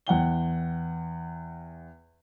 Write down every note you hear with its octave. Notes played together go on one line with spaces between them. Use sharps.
E2 F#5 G5 G7